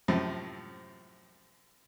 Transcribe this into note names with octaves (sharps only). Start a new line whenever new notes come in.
F#2 A2 C3 F3